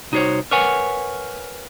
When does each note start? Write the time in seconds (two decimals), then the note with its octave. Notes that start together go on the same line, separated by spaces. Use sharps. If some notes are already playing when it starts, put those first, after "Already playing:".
0.12 C2 D#4 F#4 G#4 C5 C#5
0.51 A#4 B4 C#5 F#5 G#5